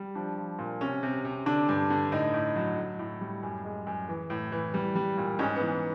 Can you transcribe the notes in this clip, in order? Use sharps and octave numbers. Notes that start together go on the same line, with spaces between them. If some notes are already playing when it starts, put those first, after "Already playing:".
Already playing: G3
F3 D4
F3
A#2
C3 C#4
C3
C3
D3 D4
G2
D3
A2 D#4
A2
F#3
A2
A2
G3
F#2
G#3
F#2
E3
A2
E3
G3
G3
A#2
G#2 C#4
B3
E3